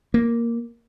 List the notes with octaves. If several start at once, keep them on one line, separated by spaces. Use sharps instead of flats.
A#3